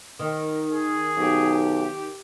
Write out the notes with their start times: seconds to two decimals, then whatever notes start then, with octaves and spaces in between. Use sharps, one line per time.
0.19 D#3
0.72 G#4
1.17 B1 G4